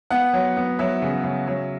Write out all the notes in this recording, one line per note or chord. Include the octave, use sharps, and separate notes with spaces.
B3 F#5
F#3
B3
F#3 E5
C#3
C#3
F#3